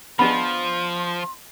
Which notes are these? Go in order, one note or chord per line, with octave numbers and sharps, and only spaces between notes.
F3 B3 D4 G#4 D#5 B5 C6